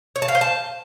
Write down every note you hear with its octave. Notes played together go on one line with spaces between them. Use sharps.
C#5
A5
F5
C5
A5